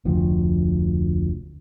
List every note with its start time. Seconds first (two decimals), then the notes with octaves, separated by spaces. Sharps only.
0.05 F1 D2 F3